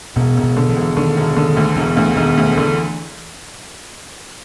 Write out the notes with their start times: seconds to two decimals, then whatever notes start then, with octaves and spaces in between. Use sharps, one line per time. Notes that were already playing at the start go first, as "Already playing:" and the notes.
0.16 E1 B2
0.37 E1
0.43 B2
0.57 D3
0.69 E3
0.76 E1
0.97 D3 D#3
1.17 E1
1.36 D3 D#3
1.57 D2
1.76 E1 E3
1.97 D2
2.17 E1 D#3
2.37 D2
2.57 D3 E3